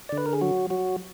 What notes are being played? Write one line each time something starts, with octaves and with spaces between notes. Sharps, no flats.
D3 D5
B4
A#4
G#4
F#3 F#4
F#3 F#4